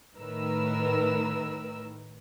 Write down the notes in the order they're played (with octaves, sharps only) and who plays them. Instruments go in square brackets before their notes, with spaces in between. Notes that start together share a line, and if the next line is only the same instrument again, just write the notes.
[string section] A2 D#3 A#4 B4 E6